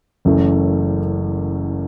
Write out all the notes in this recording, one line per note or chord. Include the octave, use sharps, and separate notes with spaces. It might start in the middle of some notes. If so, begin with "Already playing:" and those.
F#1 F#2 E3 A3